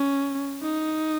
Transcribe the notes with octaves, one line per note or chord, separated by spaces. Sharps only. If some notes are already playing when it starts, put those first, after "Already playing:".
Already playing: C#4
D#4